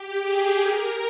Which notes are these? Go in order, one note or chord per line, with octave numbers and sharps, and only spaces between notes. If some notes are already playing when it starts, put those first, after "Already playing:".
Already playing: G4
G#4
A#4